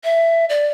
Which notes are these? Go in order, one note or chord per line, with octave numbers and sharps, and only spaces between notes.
E5
D5